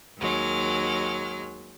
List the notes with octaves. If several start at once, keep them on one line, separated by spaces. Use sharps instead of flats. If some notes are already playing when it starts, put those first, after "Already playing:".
D#2 F#3 G#3 F6